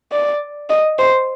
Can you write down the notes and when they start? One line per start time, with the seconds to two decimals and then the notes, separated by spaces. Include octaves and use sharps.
0.12 D5
0.70 D#5
0.99 C5